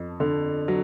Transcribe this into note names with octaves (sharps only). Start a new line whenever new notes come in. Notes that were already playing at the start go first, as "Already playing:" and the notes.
Already playing: F2
D3
F#3